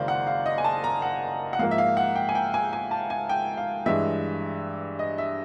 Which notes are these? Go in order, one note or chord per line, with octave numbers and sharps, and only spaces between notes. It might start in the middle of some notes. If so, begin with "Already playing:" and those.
Already playing: F#1 F#2 D#3 G#3 C5 D5 F5
F#5
F5
D#5
G#5
A5
A#5
F#5
F#5
G#2 F3 A#3 F5
E5
F5
F#5
G5
G#5
G5
G#5
G#5
A5
G#5
G5
F5
G2 E3 G#3 E5
D#5
E5